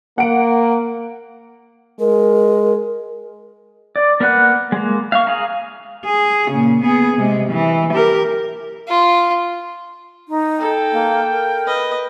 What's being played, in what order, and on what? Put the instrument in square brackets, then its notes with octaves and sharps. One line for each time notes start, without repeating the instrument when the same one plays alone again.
[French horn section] A#3 [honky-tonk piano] F#5 D7
[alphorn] G#3 [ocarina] A#4
[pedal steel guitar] D5
A#3 A#4 B4 F#5 F#6
G#3 A#3
F5 C#6
G#4 F5 A#5
[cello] G#4
A#2 C#3
B3 G#4
C3 G#3
E3
G4 A#4
[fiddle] F4
[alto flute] D#4
[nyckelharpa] A4 [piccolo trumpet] G5
[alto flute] A#3
A#4
[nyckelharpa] B4 D#5